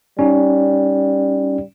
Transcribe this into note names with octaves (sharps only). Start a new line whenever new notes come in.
G3 C#4 D#4